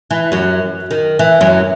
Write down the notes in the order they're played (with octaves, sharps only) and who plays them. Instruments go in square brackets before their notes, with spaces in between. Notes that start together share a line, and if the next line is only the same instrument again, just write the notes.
[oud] E3
F#2 F#3
D#3
E3
F#2 F#3